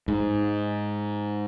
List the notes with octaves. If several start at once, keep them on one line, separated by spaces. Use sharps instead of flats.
G#2